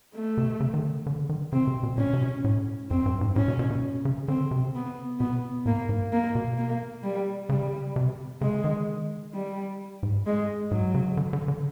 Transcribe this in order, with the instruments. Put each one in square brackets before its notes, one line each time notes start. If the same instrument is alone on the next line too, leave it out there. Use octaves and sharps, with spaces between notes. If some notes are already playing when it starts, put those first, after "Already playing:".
[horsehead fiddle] A3
[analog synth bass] C3
C#3
D#3
D3
D3
D#3
[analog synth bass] C#3 [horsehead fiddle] C4
[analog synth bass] C3
B2
[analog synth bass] A#2 [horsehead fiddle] C#4
[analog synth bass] C3
B2
A2
[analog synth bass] F2 [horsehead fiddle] C4
[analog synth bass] G2
G#2
[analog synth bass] A2 [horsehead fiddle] C#4
[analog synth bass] B2
B2
B2
C#3
[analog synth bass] D3 [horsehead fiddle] C4
[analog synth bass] C3
[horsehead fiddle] B3
[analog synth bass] B2 [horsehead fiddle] B3
[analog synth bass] A2 [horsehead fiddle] A#3
[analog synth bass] G#2
[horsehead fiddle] A#3
[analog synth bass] B2
[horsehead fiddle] A#3
G3
[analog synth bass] C#3 [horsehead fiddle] G3
[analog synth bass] C3
[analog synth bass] C#3 [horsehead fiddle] G#3
[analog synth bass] D#3
[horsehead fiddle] G3
[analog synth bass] G#2
[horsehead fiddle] G#3
[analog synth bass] G#2 [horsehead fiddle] F#3
[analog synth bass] C#3
D3
D3
D3